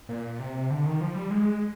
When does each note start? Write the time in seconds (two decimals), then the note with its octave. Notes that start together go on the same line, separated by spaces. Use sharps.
0.09 A#2
0.39 C3
0.70 D3
0.86 D#3
1.01 F3
1.15 G3
1.30 G#3